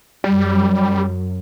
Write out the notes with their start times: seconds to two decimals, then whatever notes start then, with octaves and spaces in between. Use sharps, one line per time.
0.24 F#2 G3